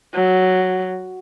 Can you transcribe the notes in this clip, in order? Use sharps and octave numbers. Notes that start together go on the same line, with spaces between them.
F#3